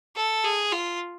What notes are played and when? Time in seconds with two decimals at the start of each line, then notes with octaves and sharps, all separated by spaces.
0.16 A4
0.44 G#4
0.72 F4